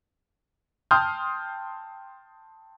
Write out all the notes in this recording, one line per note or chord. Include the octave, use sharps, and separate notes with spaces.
G5 A5 C6 D#6 F6 G6